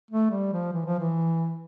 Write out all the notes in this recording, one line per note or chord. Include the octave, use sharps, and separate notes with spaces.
A3
G3
F3
E3
F3
E3